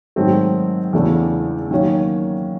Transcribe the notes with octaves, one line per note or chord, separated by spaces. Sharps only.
G#2 D#3 F#3 A3 C4
E2 C#3 E3 A3 D4
D#3 F#3 A#3 C#4